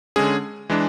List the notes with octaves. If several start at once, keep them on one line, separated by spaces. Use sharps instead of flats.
D3 G#3 C#4 G#4
E3 G#3 D4